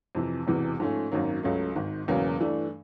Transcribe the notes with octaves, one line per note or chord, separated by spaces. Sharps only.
F2 C3 E3
E1 E2 C3 E3
G#2 F3 A3 C#4
G#1 F#2 D#3 F#3 A#3
C#2 C#3 F#3 A3
G#1 G#2 D#3
E1 E2 C#3 F#3 A#3
G2 E3 A3 D4